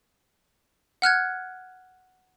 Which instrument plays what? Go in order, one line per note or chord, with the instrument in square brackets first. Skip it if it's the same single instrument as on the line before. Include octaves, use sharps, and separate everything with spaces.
[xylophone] F#5 F6 F#6 G#6